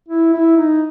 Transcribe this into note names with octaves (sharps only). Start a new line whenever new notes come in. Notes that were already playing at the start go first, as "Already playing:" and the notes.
E4
E4
D#4